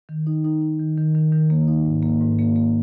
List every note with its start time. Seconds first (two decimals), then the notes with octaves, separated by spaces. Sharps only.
0.09 D#3
0.27 D#4
0.44 D#4
0.62 D#4
0.80 D#3
0.97 D#3
1.15 D#3
1.32 D#3
1.50 A#3
1.68 D#4
1.85 G#2
2.03 A#3
2.20 G#2
2.39 A#3
2.56 A#3